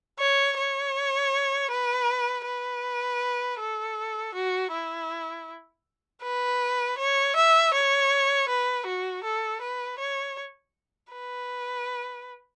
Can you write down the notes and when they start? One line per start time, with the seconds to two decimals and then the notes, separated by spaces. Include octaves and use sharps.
0.19 C#5
0.57 C#5
1.71 B4
2.45 B4
3.60 A4
4.35 F#4
4.72 E4
6.23 B4
6.98 C#5
7.36 E5
7.74 C#5
8.49 B4
8.86 F#4
9.24 A4
9.62 B4
9.99 C#5
11.13 B4